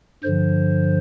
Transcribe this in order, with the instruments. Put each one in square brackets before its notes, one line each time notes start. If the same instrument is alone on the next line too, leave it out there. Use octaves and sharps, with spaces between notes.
[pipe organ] G2 D3 F3 C5